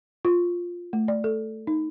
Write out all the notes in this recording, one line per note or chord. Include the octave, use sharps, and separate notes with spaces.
F4
A3
D5
A4
D#4